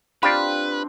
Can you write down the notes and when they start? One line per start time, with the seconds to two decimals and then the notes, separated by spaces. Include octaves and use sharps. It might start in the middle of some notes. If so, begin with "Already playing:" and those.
0.23 C4 D4 F4 G4 B4 D5 B5